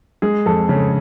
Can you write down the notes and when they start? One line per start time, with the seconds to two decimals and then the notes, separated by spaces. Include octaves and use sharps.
0.22 G#3 G#4
0.46 F2 A4
0.69 C#3